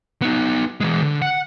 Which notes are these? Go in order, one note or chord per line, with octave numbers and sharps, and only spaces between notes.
B3 D#4
E3 G#3
D3
F#5